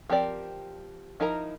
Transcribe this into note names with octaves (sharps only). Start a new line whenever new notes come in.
F3 C4 G4 A#4 D5
F3 D#4 E4 A#4 A#5